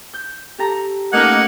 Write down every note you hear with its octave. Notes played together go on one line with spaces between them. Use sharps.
G6
G4 A4 A#5
A3 A#3 C#4 D#4 F#5